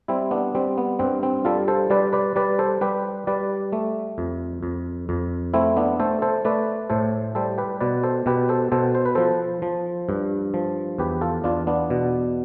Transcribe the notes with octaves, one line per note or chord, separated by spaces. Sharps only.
G3 C4 E4
B3 D4
G3 C4
B3
G2 C4
C4
G3 F4 A4
A4 C5
G3 B4 D5
B4 D5
G3 B4 D5
A4 C5
G3 G4 B4
G3 B4 D5
A3
F2
F2
F2
A3 C4 E4
B3 D4
A3 A4 C5
A4 C5
A3 B4 D5
A2 A4 C5
G3 A4 C5
G4 B4
B2 B4 D5
A4 C5
B2 G4 B4
A4 C5
B2 A4 C5
C5
B4
F3 A4 C5
F3
G2
F3
E2 G4 B4
F4 A4
E2 D4 F4
B3 D4
B2